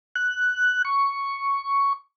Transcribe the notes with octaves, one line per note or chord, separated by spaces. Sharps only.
F#6
C#6